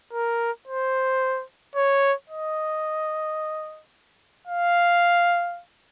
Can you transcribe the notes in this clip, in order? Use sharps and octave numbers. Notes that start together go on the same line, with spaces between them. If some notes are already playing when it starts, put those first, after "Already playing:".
A#4
C5
C#5
D#5
F5